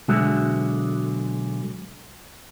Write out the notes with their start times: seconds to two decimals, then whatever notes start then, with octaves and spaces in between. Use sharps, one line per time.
0.08 B1 D3 G#3 F#4 E5